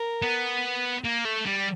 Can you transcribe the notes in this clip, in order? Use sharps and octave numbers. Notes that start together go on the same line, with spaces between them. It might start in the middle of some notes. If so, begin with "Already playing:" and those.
Already playing: A#4
B3
A#3
A3
G3